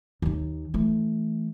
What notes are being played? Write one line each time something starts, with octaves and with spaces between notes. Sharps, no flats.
D#2 D#3
E3 A3